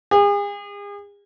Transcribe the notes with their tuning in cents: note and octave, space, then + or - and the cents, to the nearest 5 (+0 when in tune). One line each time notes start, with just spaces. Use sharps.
G#4 -40